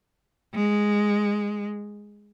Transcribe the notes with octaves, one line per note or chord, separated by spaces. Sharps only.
G#3